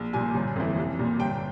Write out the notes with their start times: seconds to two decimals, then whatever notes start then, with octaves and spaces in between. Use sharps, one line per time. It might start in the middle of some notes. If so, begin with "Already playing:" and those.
Already playing: A#1
0.13 A#2 G3 G#5
0.35 G1
0.56 F2 E3
0.78 C2
0.99 A#2 G3
1.20 G1 G5